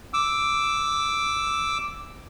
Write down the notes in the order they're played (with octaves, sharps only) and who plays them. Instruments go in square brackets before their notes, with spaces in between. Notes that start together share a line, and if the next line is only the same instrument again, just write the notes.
[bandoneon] D6 E6